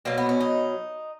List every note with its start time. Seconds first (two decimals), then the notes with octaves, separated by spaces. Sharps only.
0.05 B2 F#3 A#3
0.18 B3
0.29 C#4
0.40 D#4